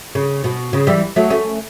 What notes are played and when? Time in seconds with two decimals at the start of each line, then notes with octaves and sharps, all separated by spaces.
0.15 C#3
0.44 B2
0.73 C#3
0.87 E3 G3
1.16 F#3 A3
1.30 A3 C#4